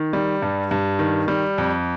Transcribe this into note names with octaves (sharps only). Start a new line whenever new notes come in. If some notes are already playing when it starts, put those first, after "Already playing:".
Already playing: D#3
G3
G2
G2
D#3
G3
F2